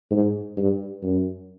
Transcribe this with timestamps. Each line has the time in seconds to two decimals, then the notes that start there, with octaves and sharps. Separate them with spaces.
0.11 G#2
0.57 G2
1.03 F#2